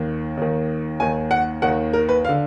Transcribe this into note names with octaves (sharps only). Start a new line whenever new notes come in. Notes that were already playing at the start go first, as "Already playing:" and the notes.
Already playing: D#2 D#3
D#2 D#3
D#2 D#3 G#5
F#5
D#2 D#3 F#5
A#4
B4
F5
D3